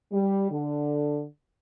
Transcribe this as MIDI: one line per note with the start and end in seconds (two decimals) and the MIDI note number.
0.12 0.50 55
0.50 1.25 50